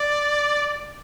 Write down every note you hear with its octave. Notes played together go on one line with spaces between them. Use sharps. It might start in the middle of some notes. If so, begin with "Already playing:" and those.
Already playing: D5